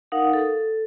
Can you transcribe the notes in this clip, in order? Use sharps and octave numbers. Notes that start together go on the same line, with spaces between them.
D#4 A#4 F5 F#5 D#6
A4